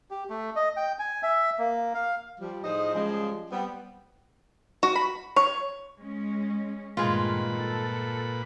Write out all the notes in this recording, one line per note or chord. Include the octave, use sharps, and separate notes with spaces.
G4
A3
D#5
G5
G#5
E5
A#3
F5
F3 G3
A2 F3 D#4 G#4 C5 D#5
C#3 F3 G3 G#3
G3 B3 C4
F#4
B5
C#5
G#3 C#4
G2 A#2 D#3 G#3 A3 F4 B4
A4